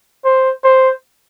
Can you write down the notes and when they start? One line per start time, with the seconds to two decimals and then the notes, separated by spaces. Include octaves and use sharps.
0.24 C5
0.64 C5